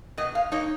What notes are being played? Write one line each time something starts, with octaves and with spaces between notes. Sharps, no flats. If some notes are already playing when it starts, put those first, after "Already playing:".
B2 D#5
F5
A#3 D#4 C#5